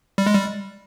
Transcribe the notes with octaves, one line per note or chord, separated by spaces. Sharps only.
G3
G#3
G3